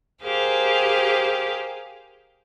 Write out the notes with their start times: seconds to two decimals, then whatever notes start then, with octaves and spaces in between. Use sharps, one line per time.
0.22 G4 G#4 A#4 C5 F5